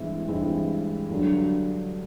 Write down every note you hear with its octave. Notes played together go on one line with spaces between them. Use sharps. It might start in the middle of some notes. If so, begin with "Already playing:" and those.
Already playing: G2 E3 G#3 C4 E4
G2 E3 G#3 C4 E4
G2 D3 F#3